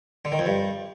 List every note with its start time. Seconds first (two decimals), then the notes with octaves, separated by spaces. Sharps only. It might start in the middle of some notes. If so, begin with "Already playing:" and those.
0.25 D3
0.32 D#3
0.39 F2
0.46 G2